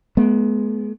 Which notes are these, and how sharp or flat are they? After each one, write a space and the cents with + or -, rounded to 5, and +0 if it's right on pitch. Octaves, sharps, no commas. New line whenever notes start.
G#3 +35 B3 -20